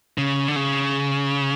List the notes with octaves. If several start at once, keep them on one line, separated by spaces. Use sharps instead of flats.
C#3
D3
C#3